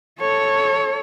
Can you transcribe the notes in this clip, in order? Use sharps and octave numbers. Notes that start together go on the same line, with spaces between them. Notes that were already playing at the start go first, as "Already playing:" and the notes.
A4 C#5